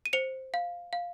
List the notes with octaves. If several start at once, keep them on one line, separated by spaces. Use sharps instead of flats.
D#7
C5 C#7 F7
F5
F5